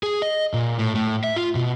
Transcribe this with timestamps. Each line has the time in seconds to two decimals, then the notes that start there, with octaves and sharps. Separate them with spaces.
0.03 G#4
0.22 D#5
0.54 A#2
0.79 A2
0.95 A2
1.24 E5
1.36 F4
1.55 B2